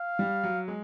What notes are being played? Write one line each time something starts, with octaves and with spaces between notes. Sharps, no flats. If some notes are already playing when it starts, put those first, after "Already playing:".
Already playing: F5
G3
F#3
G#3